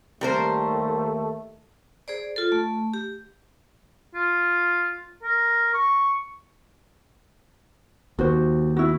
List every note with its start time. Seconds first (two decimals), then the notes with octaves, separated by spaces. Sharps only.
0.21 D#2 D#3 G3 A3 A#4 C5
2.08 G#4 C5 D5
2.36 F4 A4
2.52 A3
2.94 G4
4.15 F4
5.23 A#4
5.74 C#6
8.19 D#2 F#4 C5
8.76 E4 F#4